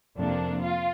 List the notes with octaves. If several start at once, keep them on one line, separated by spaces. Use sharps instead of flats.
F2 C3 F3 A#3 D4
F4